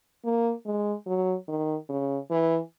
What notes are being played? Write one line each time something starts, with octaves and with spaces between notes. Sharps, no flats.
A#3
G#3
F#3
D#3
C#3
E3